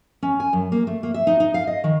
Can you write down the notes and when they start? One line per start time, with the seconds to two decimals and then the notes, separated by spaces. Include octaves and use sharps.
0.23 C#4
0.40 G#5
0.53 F#2
0.72 A#3
0.87 A3
1.03 A#3
1.14 E5
1.27 D#4
1.40 D#4
1.54 F5
1.67 D#5
1.84 D#3